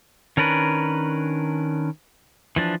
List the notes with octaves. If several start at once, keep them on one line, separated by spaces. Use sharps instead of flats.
D#3 C#4 D4 A#4 B4
E3 F3 D4